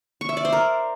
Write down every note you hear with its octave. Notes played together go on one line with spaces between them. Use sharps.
C#6
E5
D5
C5
A#4